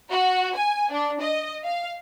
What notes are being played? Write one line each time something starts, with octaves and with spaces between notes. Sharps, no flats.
F#4
G#5
D4
D#5
F5